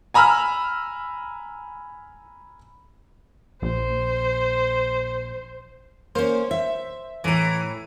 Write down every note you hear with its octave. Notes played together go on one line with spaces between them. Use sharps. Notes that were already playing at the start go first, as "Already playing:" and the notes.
G#5 A#5 B5 E6 F6
A#1 C5
A#3 C#4 C5
E5
A2 E3 A#5